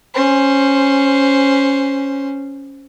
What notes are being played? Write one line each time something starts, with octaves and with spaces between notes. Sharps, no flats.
C#4 C5